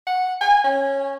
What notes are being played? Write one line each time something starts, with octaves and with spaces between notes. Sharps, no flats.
F#5
G#5
C#4